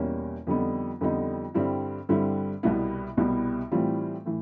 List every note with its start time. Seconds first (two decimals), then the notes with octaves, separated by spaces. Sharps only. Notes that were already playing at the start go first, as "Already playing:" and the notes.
Already playing: E2 B2 G3 A#3 C#4
0.47 F2 D3 G3 B3 D#4
1.01 F2 D3 G3 B3 D#4
1.54 G2 D3 G3 C4 E4
2.09 G2 D3 G3 C4 E4
2.63 C2 B2 G3 B3 E4
3.17 C2 B2 G3 B3 E4
3.72 A2 E3 G3 C4 F4
4.26 A2 E3